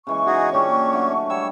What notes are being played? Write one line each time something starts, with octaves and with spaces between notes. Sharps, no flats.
C#3 E3 G#3 C#6
D#4 F#4 G#4
A#2 C#3 C#4 D4 G4
D3 F#3 A3
G3 C#5 E6